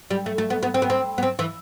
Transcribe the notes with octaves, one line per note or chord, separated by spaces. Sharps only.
G3
A3
A3
B3
B3
C4
B3
C4
B3
C4
E3